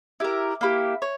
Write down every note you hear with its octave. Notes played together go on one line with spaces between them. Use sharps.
E4 G4 A#4
A#3 E4 G4
C#5